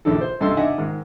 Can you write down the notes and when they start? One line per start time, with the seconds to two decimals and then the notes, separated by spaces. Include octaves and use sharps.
0.05 A#1 D#3 D4 E4 A4
0.21 C5
0.40 C2 G2 A4 D#5 C6 E6
0.57 D4 D#4 D#5 E5 F#5 G#5
0.78 G#2 D#3